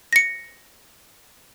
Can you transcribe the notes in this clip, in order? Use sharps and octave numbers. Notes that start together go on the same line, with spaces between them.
A#6 C#7